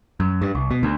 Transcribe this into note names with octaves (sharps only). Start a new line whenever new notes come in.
F#2
G2
C2
B2
D2